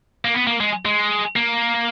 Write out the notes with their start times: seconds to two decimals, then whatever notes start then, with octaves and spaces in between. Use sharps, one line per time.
0.25 A#3
0.34 B3
0.47 A#3
0.60 G#3
0.85 G#3
1.36 A#3